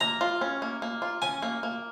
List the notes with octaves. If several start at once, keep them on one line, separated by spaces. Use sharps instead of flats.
A#3 A#5
F4
C#4
A#3
A#3
F4
C#4 G#5
A#3
A#3